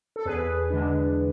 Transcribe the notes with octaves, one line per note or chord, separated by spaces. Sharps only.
A4
E2 G#4 B4
D3 G#3 D4